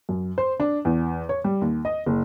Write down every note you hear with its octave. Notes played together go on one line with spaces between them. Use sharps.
F#2
C5
D4
E2
C#5
G3
D#2
D#5
F#1